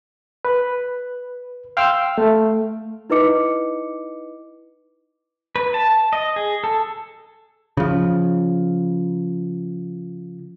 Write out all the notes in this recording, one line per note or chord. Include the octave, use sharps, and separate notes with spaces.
B4
F5 G5 C6 E6 F6
A3
D#4 E4 B4 D#5 D6 C#7
B4
A5
D#5
G#4
A4
C#3 F3